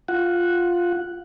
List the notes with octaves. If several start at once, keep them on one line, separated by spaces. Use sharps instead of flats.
F4 F#5